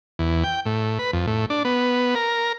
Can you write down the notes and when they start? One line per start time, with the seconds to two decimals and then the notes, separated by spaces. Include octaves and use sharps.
0.19 E2
0.44 G5
0.66 A2
0.99 B4
1.13 F2
1.27 A2
1.50 D4
1.65 B3
2.15 A#4